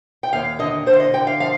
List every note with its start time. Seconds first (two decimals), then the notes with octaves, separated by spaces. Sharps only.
0.23 G5
0.33 D#2 F5
0.59 D3 D#5
0.86 D3 C5
0.93 F5
1.00 D#5
1.14 D3 G5
1.27 F5
1.40 F3 F5